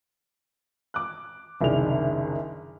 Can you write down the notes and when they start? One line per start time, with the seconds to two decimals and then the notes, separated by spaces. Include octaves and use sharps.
0.94 D6 F#6
1.61 F#1 C2 D#3 D4 G#4 F7